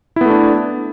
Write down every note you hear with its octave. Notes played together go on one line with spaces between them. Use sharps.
A3 B3 D4 E4